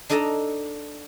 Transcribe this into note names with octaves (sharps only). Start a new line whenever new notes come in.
D4 D#4 A4 D#5 A5 A#5